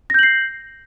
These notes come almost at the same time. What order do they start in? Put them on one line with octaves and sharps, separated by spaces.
A#6 G6 F#7 C7